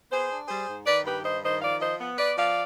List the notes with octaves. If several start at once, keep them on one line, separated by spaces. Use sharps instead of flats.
B3 G#4 C5
D4
G3 G#4 C5
G#2
D#3 B4 D5
G2 G4 B4
G2 C5 D#5
D#3 C5 D#5
F3 D5 F5
F3 C5 D#5
B3
B3 B4 D5
F3 D5 F5